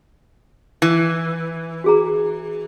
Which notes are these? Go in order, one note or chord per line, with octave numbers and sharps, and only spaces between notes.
E3
F#4 G#4 A#5